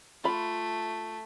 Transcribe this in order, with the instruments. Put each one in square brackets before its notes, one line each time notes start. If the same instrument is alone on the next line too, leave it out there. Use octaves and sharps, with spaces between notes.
[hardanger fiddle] A3 [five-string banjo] F4 B5